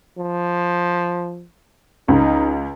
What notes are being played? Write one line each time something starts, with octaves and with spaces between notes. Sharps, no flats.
F3
C#2 D#4